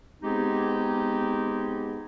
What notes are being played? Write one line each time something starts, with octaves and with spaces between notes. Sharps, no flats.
G#3 B3 C4 D#4 G4 G#4